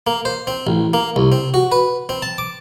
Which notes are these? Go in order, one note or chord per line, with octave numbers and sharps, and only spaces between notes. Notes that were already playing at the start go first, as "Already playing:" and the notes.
A#3
C5
C4
A1
A#3
C2
C4
F#4
B4
C4
A5
D6